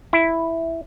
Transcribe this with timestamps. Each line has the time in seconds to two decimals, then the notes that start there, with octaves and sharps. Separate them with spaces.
0.13 E4